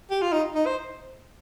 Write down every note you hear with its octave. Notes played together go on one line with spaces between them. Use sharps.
G4
F4
D#4
D#4
C5